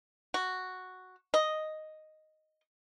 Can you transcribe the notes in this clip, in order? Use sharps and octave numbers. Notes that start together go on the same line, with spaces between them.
F#4
D#5